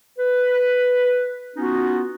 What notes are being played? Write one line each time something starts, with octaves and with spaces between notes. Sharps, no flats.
B4
B3 C#4 D#4 F4 F#4